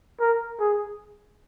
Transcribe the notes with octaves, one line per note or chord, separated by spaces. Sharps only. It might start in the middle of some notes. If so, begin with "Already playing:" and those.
A#4
G#4